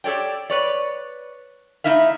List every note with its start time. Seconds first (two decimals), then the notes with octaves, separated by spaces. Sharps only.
0.04 G4 A4 C#5 D5 G5
0.50 B4 C#5 D5
1.84 A3 C4 D#4 E4 E5 F5